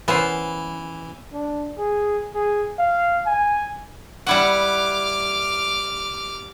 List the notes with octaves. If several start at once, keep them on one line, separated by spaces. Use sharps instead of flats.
E3 B3 C#4 C5
D4
G#4
G#4
F5
G#5
G3 E4 F#5 D6 F6